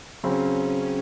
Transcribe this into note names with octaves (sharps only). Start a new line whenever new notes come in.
C#3 F#3 C4 C#4